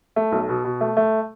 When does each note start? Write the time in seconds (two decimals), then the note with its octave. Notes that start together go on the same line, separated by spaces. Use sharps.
0.16 A3
0.32 B1
0.49 B2
0.64 B2
0.81 A3
0.97 A3